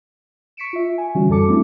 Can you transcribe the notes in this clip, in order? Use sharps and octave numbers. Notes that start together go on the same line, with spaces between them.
C#6 B6 C#7 D7 E7
F4 E5
G#5
D3 E3 G3 C#4 F#4
F#2 G3 A4 A5 D6 C#7
F#3 A3 C4 D4 E4